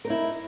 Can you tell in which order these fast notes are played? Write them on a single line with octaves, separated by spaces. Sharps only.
A#4 D#4 E4